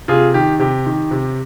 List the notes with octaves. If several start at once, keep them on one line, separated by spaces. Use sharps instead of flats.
C3 F4 G#4
D#3 G4
C3 G4
D#3
C3